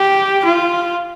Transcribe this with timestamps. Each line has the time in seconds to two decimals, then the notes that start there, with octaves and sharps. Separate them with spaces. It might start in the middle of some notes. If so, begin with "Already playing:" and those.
Already playing: G4
0.45 F4